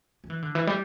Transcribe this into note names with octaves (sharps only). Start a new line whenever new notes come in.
F#3
E3
D3
E3
G3